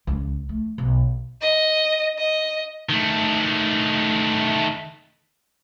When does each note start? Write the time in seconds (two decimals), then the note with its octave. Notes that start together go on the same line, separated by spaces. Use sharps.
0.07 C#2
0.49 A3
0.78 B1
1.42 D#5
2.18 D#5
2.89 D#3 A3